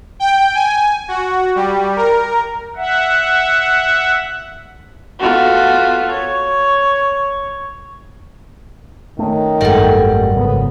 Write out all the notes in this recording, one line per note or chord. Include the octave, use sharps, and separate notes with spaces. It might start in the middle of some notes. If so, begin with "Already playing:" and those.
G5
G#5
F#4
G3
A#4
E5 F#5
B3 F4 F#4 A4
C#5
D#3 A3 C#4
G#1 F#2 G3 A3 A4 A#4 F#5
G#1 F#2 C#3 B3